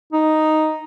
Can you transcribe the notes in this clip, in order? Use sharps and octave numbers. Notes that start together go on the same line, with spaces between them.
D#4